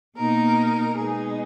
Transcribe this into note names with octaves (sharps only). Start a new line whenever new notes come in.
B2 A#3 D#4 A#4
B2 G#3 B3 D#4 G#4